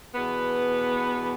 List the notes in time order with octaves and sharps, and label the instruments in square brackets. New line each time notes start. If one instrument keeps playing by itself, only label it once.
[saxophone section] E2 B2 B3